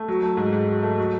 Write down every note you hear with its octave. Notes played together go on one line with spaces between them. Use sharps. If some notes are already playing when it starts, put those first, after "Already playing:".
Already playing: A3
F#3
A3
G#2
G#2
F#3
A3
F#3